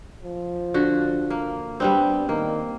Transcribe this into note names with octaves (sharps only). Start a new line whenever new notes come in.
F3
D3 F#4
A#3
G3 B3 C4 D4
D#3 A#3